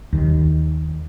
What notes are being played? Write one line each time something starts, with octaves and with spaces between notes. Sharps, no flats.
D#2 D#3